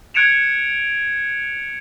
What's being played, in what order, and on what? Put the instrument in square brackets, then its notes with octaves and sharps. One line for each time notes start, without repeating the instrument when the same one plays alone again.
[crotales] F#6 G#6 C#7 D7 E7 F7